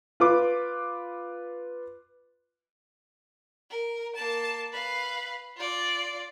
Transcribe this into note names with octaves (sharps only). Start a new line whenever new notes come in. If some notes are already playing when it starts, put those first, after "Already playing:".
F4 B4 D6
A#4
A#3 A5
B4 F5
F4 D5